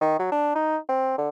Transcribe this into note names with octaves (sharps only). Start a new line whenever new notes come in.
D#3
F#3
D4
D#4
C4
D3